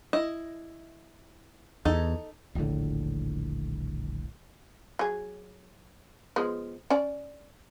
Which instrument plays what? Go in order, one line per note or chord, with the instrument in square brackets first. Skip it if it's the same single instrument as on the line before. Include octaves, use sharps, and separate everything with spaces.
[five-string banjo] E4 D#5
[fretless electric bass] E2 [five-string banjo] D#4 A4
[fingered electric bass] D#1 A#1 A2 D3
[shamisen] F#3 G#4
F3 G#3 B3
C#4 D5